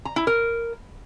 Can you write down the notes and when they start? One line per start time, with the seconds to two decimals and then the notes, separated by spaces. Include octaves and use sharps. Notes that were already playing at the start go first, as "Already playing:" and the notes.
0.05 A#5
0.16 E4
0.27 A#4